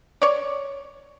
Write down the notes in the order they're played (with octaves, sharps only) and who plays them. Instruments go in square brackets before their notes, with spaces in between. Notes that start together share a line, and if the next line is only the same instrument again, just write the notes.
[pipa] C#5 D5